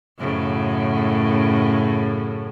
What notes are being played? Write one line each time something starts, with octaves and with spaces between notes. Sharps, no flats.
F#2 A2 C#3